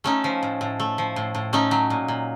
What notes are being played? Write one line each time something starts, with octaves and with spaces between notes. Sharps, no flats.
A3 C#4 D#4
F3
A2
A2
A3
F3
A2
A2
A3 C#4 D#4
F#3
A#2
A#2